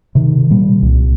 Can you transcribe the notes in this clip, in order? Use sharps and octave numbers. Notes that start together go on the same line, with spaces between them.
C3 D#3
A#2 G3
C2